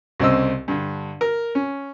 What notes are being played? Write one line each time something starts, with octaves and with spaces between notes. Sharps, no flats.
C2 C#3 C4 D#5 E6
G2 D3
A#4
C#4